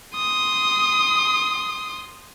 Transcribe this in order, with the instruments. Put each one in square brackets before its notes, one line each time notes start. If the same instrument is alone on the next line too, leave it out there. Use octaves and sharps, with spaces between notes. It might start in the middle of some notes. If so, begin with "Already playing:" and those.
[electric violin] C6 D#6